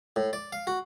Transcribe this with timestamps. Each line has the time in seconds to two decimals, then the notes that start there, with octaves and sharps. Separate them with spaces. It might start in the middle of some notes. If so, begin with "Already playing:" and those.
0.16 A2
0.33 D5
0.52 F5
0.67 F#4